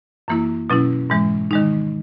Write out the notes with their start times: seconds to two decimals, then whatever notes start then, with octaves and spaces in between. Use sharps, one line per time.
0.28 F#2 E3 A#3 E4
0.70 B2 F#3 C#4 E4
1.10 G#2 E3 G#3
1.51 D#3 G#3 D#4